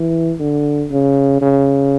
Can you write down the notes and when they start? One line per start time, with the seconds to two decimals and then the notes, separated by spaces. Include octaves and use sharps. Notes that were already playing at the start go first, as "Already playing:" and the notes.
Already playing: E3
0.40 D3
0.91 C#3
1.41 C#3